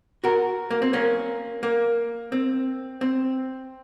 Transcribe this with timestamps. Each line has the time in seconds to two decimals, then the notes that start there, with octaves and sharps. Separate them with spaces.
0.24 F#4 A#4
0.71 A#3
0.82 C4
0.93 A#3 C#4
1.63 A#3
2.32 C4
3.01 C4